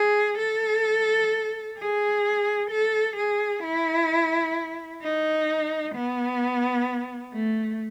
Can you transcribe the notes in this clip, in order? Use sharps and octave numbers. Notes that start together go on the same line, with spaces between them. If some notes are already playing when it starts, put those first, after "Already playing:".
Already playing: G#4
A4
G#4
A4
G#4
E4
D#4
B3
A3